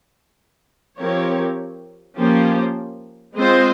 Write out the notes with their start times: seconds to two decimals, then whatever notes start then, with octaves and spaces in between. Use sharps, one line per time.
0.99 F3 C4 G4 A#4 C#5
2.17 F3 A#3 C#4 G4 C5
3.36 G#3 C4 F4 C5 D#5